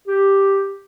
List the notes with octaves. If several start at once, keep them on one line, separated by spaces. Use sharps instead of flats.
G4